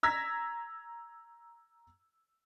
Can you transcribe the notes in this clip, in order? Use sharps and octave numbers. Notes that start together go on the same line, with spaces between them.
A#5 E6 G#6 A#6 B6